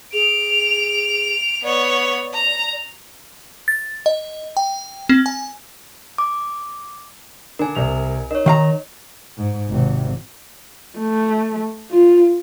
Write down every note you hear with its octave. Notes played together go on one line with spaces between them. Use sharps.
G#4 D7 F7
B3 C#5 D5
A#5
A6
D#5
G5
C4
G#5
D6
D3 D4 A#4 G#5
C2 F7
D#4 A#4 C#5
D#3 F5 A#5
G#2
G#1 C3
A3
F4